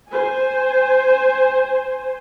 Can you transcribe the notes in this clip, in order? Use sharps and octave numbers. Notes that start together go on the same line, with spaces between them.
C5 G#5